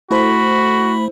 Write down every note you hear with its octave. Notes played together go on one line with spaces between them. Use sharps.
A3 E4 F#4 A4 C5 B5